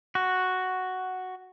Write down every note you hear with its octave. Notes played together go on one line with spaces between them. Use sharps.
F#4